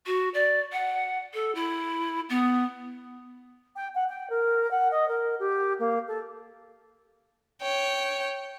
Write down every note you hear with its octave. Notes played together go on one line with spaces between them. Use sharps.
F#4
D5
F#5
A4
E4
B3
G5
F#5
G5
A#4
F#5
D#5
A#4
G4
A#3
A4
C#5 G5